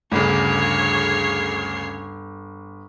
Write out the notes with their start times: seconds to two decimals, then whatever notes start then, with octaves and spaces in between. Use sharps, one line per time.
0.12 G1 D2 C#3 C#5 C7